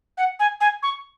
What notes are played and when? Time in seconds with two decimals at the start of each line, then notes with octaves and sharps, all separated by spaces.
0.17 F#5
0.39 G#5
0.60 G#5
0.83 C#6